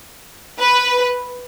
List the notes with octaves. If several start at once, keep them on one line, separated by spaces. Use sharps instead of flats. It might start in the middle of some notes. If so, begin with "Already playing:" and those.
B4